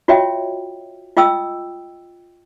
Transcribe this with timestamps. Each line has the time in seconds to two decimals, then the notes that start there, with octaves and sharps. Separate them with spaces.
0.08 F4 F#4 C#5 D#5 E5 G5
1.17 F4 D#5 G5 D#6 E6